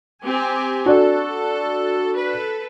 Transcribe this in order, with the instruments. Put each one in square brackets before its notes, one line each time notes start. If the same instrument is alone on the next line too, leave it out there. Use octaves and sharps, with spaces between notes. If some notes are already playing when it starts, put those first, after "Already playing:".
[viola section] C4 G4 G#5
[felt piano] D4 F#4 [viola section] A4
[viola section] A4 B4